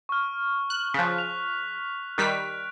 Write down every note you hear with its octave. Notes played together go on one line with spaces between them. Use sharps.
C#6 F6
F#6
C#3 F3 F#6 B6
F7
D#3 G3 F#6 B6 D7